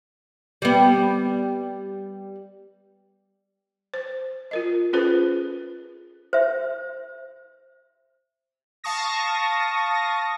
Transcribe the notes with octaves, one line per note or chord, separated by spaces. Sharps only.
G3 B3
C5
F4 A#4 D#5
C#4 F4 G#4 A4 B4 C5
C5 E5
F5 A5 C#6 D#6 A#6